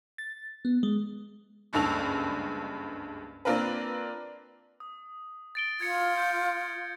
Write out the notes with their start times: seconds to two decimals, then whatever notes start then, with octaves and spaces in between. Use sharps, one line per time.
0.18 A6
0.65 B3
0.83 G#3
1.73 F#1 C#2 G2 A4 F7
3.45 A#3 C4 D4 F4 A#4 B4
4.80 D#6
5.55 A6 D7 G7
5.81 F4 G#6 C#7
6.17 G6